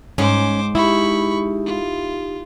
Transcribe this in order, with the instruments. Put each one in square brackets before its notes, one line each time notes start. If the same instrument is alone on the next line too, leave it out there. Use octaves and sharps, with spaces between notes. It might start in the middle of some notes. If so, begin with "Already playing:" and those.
[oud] G#2 [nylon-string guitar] C#4 [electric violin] C5 D6
[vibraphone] D#4 G4 [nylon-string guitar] E4 [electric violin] B5 C#6
[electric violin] F4